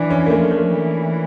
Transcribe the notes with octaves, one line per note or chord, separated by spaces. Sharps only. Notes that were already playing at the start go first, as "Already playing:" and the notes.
Already playing: E3 D4
C#4
A#3
F3 A3
A3
E3